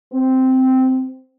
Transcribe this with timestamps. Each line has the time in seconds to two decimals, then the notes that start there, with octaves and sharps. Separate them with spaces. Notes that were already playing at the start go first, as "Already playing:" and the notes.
0.12 C4